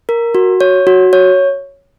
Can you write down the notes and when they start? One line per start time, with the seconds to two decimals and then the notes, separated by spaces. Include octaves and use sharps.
0.09 A#4
0.35 F#4
0.61 C#5
0.87 F#4
1.13 C#5